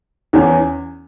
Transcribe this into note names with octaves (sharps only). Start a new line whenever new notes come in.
E2 E3 C#4